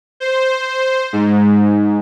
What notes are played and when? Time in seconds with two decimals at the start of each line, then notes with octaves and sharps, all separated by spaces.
0.20 C5
1.13 G#2